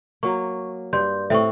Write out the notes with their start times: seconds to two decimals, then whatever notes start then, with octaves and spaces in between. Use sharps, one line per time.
0.23 F#3 A#3 C#6
0.93 G2 C6 G6
1.30 A2 C4 E5 C#6